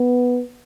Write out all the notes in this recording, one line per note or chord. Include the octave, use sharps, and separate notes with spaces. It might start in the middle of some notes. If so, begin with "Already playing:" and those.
Already playing: B3